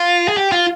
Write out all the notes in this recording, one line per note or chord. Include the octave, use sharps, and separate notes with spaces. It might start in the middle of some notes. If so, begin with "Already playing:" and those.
Already playing: F4
G#4
G4
F4